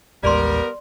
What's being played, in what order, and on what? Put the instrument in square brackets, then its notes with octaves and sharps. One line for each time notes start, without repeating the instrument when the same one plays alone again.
[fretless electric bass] A1 D#2 G#3 [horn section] G3 B3 A#4 [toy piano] D5 C6